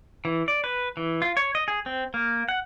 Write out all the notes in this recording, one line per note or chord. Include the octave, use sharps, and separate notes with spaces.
E3
D5
B4
E3
F4
C#5
D#5
G#4
C4
A#3
F#5